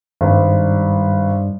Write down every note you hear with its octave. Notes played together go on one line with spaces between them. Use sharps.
G#1 G2